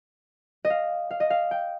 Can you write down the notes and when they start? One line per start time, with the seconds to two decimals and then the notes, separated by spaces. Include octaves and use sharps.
0.65 D#5
0.70 F5
1.11 F5
1.20 D#5
1.30 F5
1.51 G5